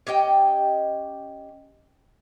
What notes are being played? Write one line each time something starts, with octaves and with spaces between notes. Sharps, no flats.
C#4 G4 D#5 G5